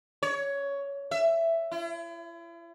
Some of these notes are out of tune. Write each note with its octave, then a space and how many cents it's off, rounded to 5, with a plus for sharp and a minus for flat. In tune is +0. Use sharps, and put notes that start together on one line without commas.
C#5 +15
E5 +10
E4 +40